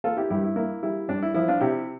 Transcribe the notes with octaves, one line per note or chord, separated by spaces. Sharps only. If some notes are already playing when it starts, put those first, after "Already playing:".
A#3 F4 A4
E4 G4
G2 E4 G4
E4
A#3 E4
G3 E4
G2 D4
E4
F3 E4
D4 F4
C3 E4 G4